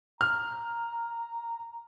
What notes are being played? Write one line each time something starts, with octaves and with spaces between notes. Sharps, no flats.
A#5 F6